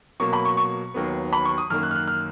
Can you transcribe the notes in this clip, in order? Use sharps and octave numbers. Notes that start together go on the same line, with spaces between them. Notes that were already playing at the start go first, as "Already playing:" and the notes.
B2 F#3 A#3 C#6
B5
C#6
C#6
D#2 D#3 F#3 B3
B5
C#6
D#6
F#2 D#3 A#3 F6
F#6
F6
F#6
F6